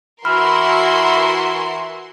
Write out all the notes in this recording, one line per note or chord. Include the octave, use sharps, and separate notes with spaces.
E3 E4 F#4 A#4 B5 C6 F6